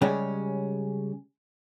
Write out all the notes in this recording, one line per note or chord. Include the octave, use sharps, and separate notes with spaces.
C#3 G3 G#3 C#4